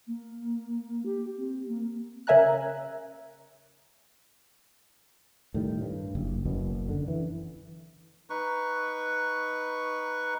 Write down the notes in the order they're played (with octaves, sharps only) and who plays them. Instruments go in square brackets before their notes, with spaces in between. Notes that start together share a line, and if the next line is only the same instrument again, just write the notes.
[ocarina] A#3
G4
C4
A#3
[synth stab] C#3 A#4 E5 G#5 A#5 F#6
[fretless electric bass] A2 D#3 G3
G2
F#1
F#1 F#2 B2
D3
E3
[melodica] D#4 B4 C#6